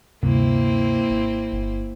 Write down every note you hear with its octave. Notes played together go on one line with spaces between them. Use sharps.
D2 G2 C3 A#3 C4 E4
G#1
G1